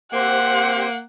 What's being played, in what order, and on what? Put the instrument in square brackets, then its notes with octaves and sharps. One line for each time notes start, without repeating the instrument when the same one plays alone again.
[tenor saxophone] A#3 [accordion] C4 G4 C5 [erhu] F#5